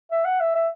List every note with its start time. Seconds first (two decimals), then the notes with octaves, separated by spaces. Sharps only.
0.11 E5
0.25 F#5
0.40 E5
0.55 E5